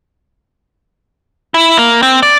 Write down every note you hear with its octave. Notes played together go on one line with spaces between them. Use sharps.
E4
A#3
C4
D5